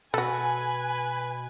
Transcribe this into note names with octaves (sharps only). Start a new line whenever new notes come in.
B2 F#4 A4 B4 G#5